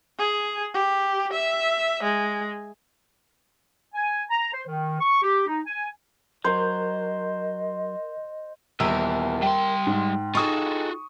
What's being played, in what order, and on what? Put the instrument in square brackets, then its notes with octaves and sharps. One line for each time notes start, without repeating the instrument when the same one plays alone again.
[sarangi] G#4
G4
E5
G#3
[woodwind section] G#5
A#5
C5
D#3
C#6
G4
D#4
G#5
[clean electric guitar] F#3 [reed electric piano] A#4 G6 [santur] C5 [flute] D#5
[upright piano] D#1 E6 [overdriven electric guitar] E2 [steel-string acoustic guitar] A#4
[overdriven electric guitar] G3 C6 [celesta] G5
[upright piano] G#2
[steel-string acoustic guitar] D#4 G#4 A4 [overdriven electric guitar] F4 F#4 [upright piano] C#6 D#6